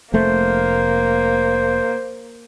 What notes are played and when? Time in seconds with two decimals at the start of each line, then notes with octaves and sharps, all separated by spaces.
0.14 F1 A3 A#3 C5